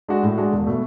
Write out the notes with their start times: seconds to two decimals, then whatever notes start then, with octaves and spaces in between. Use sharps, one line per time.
0.08 G#3 D4 F#4
0.23 A2
0.38 G#3 D4 F#4
0.53 E1
0.66 B2 A3